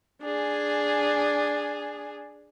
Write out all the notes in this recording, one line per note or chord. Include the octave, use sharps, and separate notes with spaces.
D4 G#4 G#5